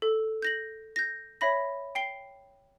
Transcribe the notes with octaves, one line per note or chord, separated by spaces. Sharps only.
A4
G6 A#6 F#7
G6 A#6
C#5 E5 B5 A#6
G5 C7 G7